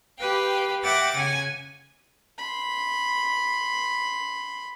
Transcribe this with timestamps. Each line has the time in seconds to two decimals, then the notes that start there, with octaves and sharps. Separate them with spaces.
0.17 G4 B4 F5 G5
0.83 E5 F#5 G5 D6 A6 A#6
1.15 C#3 F#5 G#5
2.38 B5 C6